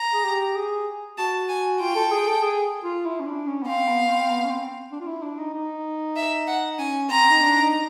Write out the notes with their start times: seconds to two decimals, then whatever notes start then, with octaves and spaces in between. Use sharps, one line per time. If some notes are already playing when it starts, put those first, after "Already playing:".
Already playing: A#5
0.14 G#4
0.24 G4
0.56 G#4
1.18 F#4 A5
1.49 G#5
1.81 F4 G5
1.96 A4
2.12 G#4
2.27 A4
2.43 G#4
2.84 F4
3.05 E4
3.20 C#4
3.26 D4
3.47 C#4
3.63 B3
3.68 C4 F5
3.88 B3
4.09 C4
4.30 B3
4.45 C#4
4.50 C4
4.92 D4
5.00 F4
5.07 E4
5.23 D4
5.38 D#4
5.54 D#4
6.16 E5
6.47 F#5
6.79 C#4 G#5
7.09 C4 A#5
7.31 D#4
7.42 D4
7.62 D#4